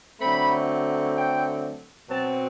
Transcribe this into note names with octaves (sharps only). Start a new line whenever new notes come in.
D3 F#3 A3 C4 B5
G5
B2 F#3 C4 A5